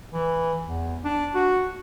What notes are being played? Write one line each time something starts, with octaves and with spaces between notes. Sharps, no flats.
E3
E2
D4
F#4